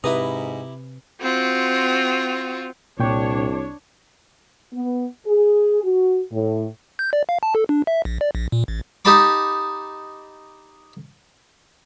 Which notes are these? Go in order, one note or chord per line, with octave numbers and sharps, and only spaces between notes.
G#2 C3 E4 G4 B4 G#5 A#5 D#6
C4 F4 F#4
C2 A#2 D4 C#5 G5 C#6
B3
G#4
F#4
A2
G6
D5
F5
A5
A4
D4
E5
A#1
D5
A#1
A#2
A1
D#4 G4 D#5 A5 B5 D6